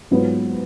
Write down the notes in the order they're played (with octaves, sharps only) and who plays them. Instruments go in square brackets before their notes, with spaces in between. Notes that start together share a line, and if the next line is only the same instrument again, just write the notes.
[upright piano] G#2 F#3 B3 F4 B4